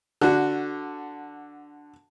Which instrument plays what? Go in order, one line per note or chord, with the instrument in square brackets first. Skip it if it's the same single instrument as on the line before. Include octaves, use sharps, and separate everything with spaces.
[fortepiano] D3 F#4